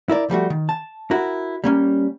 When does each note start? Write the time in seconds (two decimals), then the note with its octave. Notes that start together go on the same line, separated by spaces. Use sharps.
0.10 E4 A#4 D5
0.30 F3 G3 A3 F#4
0.50 D#3
0.69 A5
1.11 E4 F#4 A#4
1.64 G3 A#3 C#4